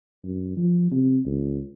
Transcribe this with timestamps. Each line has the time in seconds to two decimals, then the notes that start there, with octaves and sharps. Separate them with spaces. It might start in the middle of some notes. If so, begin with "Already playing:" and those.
0.24 F#2
0.57 F3
0.92 C3
1.26 C#2